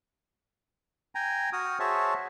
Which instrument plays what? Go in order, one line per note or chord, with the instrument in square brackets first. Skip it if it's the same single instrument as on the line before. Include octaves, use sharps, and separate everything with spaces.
[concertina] G5 G#5 A#5
F#4 D#6 F6
F#4 G#4 C5 C#5 E5 A5